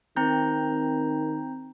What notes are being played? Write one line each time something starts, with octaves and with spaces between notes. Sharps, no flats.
D#3 C4 A#5 G6